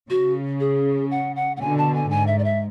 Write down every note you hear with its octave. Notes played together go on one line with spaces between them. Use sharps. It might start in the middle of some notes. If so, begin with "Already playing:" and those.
C#3 F#4
G#4
F#5
F#5
F#5
B2 D3 G#5
A5
G#5
G#2 G#5
E5
D5
E5